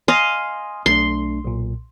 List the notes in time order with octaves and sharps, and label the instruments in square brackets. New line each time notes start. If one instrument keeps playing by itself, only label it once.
[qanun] D#5 F5 [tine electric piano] G#5 C6
[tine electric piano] B1 A3 D4 [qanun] C6
[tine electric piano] B1 A#2